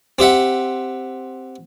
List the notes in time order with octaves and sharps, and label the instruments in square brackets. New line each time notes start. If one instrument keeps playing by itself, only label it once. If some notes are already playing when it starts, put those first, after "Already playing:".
[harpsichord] C4 G4 E5 F#5